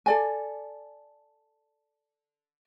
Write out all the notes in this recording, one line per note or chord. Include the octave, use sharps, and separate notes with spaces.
A4 D5 G#5